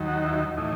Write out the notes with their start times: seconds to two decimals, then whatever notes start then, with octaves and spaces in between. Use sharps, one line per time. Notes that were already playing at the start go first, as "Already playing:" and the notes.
Already playing: D#2 D#3 F#3
0.08 F#4
0.25 E4
0.57 A2 E3 D#4